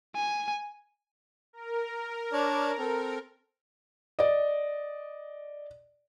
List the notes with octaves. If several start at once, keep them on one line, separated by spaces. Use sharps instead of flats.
G#5
A#4
D4 C#5 D5
C4 A4
D5 D#5